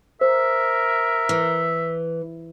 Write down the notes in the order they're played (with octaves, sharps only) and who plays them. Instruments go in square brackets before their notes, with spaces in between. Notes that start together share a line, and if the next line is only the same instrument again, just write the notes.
[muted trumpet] A#4 [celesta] C5 [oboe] E5
[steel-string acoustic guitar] E3